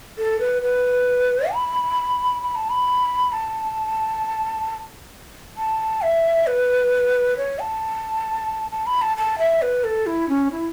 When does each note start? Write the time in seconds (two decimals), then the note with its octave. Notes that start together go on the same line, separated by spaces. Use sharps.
0.18 A4
0.40 B4
0.63 B4
1.53 B5
2.43 B5
2.56 A5
2.70 B5
3.33 A5
5.57 A5
6.02 E5
6.47 B4
7.37 C#5
7.59 A5
8.71 A5
8.86 B5
9.02 A5
9.17 A5
9.39 E5
9.62 B4
9.84 A4
10.06 E4
10.29 C#4
10.51 E4